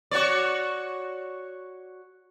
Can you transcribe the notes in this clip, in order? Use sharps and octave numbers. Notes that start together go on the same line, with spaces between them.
F#4 C#5 D5